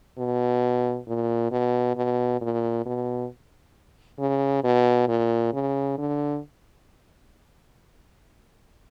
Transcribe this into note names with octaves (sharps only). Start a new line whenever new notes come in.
B2
A#2
B2
B2
A#2
B2
C#3
B2
A#2
C#3
D3